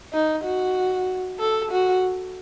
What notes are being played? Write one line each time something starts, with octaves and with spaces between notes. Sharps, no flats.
D#4
F#4
A4
F#4